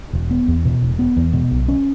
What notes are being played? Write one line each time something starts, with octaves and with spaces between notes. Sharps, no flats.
E1
B3
E2
B2
E1
B3
E2
B2
B1
C#4